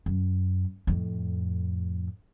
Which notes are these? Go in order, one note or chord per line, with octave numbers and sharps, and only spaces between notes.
F#2
F2 A2